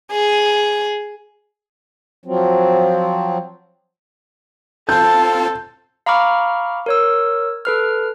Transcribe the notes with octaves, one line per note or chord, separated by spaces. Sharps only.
G#4
F3 F#3 C4
C4 F4 A4 A5 G6
F5 A#5 B5 C#6 D6 F6
A#4 C#5 E6
A4 B4 F6